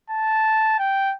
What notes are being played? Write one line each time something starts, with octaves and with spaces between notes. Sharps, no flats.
A5
G5